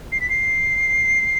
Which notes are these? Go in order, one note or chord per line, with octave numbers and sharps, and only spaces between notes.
C7
B6
C7